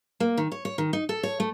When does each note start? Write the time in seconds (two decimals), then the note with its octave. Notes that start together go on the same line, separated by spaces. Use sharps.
0.20 A#3
0.37 D#3
0.52 C#5
0.65 C#5
0.78 D#3
0.93 D#4
1.09 A4
1.23 C#5
1.40 A3